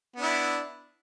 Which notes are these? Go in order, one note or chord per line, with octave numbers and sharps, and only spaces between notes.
B3 D4 E4